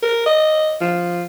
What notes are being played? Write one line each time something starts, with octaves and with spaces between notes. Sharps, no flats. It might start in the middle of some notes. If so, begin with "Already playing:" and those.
A#4
D#5
F3